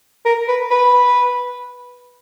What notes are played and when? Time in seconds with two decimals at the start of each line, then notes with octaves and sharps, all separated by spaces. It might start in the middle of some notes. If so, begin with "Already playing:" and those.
0.25 A#4
0.48 B4
0.71 B4